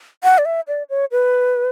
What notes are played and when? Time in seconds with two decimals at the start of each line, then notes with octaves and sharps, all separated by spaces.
0.24 F#5
0.38 D5
0.45 E5
0.68 D5
0.90 C#5
1.11 B4